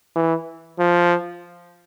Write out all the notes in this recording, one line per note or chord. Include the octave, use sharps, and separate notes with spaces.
E3
F3